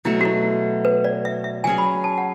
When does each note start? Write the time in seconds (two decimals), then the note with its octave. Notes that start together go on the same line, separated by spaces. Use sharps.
0.05 B2 F#3 A3 E4
0.21 F#4
0.25 E4
0.85 B4
1.04 D5
1.25 E5
1.44 E5
1.64 F#3 C#4 G#4 G#5
1.78 B5
2.04 A5
2.18 F#5